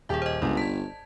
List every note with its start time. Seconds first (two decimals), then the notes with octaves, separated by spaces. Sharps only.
0.09 D#1 G4 G#4 E5
0.22 C5 D#5
0.42 G1 C#2 D5
0.57 A5 G#6 B6